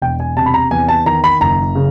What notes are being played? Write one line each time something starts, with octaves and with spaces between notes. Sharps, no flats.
E1 G5
G#5
C3 A5
B5
A#5
E2 G#5
A5
D#3 A#5
B5
F#1 A#5
C#3